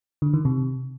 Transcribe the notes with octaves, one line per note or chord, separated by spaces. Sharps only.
D3
D#3
C3